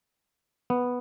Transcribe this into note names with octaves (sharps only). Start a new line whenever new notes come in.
B3